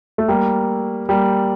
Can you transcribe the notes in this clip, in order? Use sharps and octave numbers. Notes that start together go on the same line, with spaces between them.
A3
G3 A#3
G3 A#3